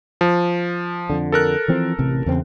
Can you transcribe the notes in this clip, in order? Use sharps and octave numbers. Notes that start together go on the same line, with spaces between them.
F3
F2 D3
A4 A#4 F#6
E3 F3 C4
A1 C3
E2 C#3 C4